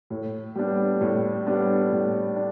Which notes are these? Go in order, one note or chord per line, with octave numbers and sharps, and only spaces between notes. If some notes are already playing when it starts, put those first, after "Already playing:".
A2
G3 B3 D4
A2
G3 B3 D4
A2
D4